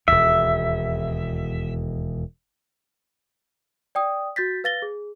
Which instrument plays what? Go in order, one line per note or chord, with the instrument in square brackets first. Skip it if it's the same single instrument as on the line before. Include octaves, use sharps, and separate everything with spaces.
[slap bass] E1 D#2 [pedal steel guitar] E5
[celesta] D5 G5 D#6
F#4 G6 A6 B6
B4 F5 A6 A#6 G7
G#4